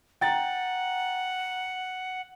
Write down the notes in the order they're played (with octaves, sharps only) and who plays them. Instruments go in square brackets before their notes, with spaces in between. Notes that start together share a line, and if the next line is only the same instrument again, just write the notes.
[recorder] F#5 [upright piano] G5 A#5 A6